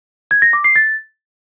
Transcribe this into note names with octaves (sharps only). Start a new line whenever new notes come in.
G#6
A#6
D6
C7
A6